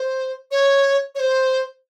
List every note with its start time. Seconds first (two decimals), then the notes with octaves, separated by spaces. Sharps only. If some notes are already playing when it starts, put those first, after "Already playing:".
Already playing: C5
0.51 C#5
1.15 C#5
1.20 C5